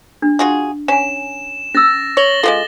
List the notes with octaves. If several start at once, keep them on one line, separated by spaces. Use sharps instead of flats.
D4
F4 F#4 G#4
C#4 F#5 G#5 E7
C#4 E6 A6 A#6
C#5 A#6 F#7 G7
G#3 B3 F4 A4 F5